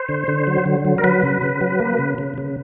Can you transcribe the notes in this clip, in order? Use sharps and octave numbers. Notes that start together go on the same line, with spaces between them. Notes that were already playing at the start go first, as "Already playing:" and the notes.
Already playing: C5
D3
D3
F#3
D3
F#3
A#4
F#3 B4
C#3
C#3
F#3
A#3
C#3
C#3
C#3